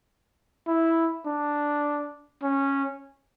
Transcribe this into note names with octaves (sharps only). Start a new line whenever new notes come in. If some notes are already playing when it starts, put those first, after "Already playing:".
E4
D4
C#4